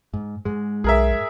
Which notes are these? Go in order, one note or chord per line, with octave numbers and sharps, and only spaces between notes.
G#2
G#2 G#3
B1 G#4 A#4 E5